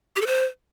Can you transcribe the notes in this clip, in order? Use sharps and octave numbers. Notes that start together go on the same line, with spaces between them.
G4
A4
C5